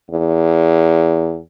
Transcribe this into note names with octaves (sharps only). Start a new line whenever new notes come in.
E2